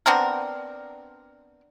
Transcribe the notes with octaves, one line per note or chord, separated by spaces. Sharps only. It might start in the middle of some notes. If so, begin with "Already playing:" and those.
B3 C4 D4 A#4